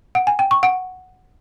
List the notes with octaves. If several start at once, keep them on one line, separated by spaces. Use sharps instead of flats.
F#5
G#5
G5
C#6
F#5